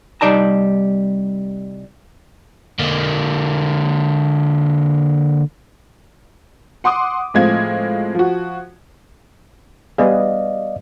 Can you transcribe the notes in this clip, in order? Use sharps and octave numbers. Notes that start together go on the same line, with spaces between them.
C2 G3 D#4 D5 A5 A#5
D3 A#3
F#5 C6 D6 D#6
A2 F3 G#3 C4 F5 G#6
F3 F#4
G3 B3 G#4 D5 D#5 F5